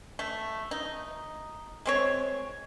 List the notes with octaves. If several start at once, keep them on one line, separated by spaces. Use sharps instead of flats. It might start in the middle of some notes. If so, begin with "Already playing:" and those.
A3
D#4
G#3 C4 C#5